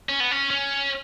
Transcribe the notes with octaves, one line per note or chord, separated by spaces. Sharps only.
C#4
B3
C#4
C#4